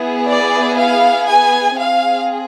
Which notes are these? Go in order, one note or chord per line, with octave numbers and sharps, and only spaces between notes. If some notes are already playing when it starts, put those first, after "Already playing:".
Already playing: B3 E4 G#4
D5
F5
G#5
C4 G#4 F5